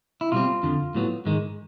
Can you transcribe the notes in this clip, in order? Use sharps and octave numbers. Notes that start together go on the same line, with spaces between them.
E4
B2 G3 C4 F4
F2 D3 F3
A2 F#3 B3
G#2 D#3 G#3